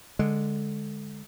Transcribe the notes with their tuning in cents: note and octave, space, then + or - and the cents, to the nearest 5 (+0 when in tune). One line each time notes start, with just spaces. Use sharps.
D3 +0 G#3 +0